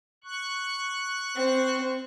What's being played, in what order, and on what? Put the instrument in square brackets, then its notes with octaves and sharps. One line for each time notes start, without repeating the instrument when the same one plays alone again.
[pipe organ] C#6 F#6
[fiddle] C4